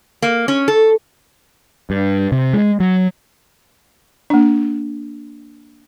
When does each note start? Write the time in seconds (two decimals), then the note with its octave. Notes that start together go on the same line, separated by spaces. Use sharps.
0.22 A#3
0.48 C#4
0.68 A4
1.90 G2
2.32 C3
2.53 G#3
2.80 F#3
4.30 A#3 D4